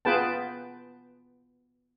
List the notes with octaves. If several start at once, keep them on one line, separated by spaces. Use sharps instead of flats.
B3 F4 G#4 B4 G5 A5